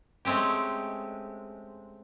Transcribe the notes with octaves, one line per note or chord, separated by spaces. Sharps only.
G#3 A3 C4 C#4 G4